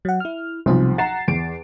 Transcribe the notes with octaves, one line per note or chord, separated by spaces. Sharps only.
F#3 F#5
E4 F6
B1 C3 F3 G3 C5
F#5 A#5 A6 C7 E7
E2 D7